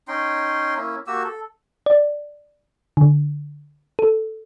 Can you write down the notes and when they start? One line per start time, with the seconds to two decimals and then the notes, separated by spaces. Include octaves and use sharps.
0.08 C#4 D#4 G5 C6
0.77 A#3 C#4 E4
1.07 A#3 F#4 G4 E6
1.24 A4
1.86 D5
2.97 D3
3.99 A4